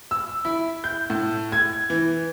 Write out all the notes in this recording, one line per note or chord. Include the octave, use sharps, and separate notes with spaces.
E6
E4
G6
A2
G#6
E3